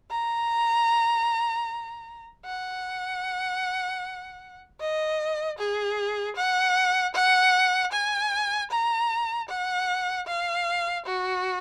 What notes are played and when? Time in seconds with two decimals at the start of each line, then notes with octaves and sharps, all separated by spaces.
0.11 A#5
2.45 F#5
4.80 D#5
5.59 G#4
6.36 F#5
7.15 F#5
7.93 G#5
8.71 A#5
9.50 F#5
10.27 F5
11.06 F#4